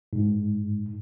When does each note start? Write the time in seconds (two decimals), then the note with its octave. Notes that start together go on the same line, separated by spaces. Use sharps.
0.13 G#2